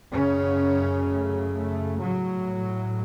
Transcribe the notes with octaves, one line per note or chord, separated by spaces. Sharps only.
F#2 C#3 C#4
A3
A3
A2 F#3